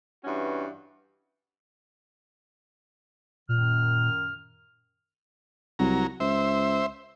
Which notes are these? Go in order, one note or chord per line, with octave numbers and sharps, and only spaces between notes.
G2 E3 C#4 F#4
F#2 A#2 D#3 F6
C2 F#3 A#5
C#2 C5 E5